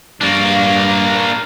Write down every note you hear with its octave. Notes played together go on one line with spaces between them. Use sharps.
G2 A#3 D4